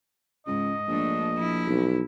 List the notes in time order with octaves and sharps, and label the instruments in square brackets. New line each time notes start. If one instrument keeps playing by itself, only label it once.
[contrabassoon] C#2 [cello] G#2 [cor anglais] D#5
[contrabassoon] A#1 [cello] A3 D4
[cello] F3 E4
[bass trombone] B1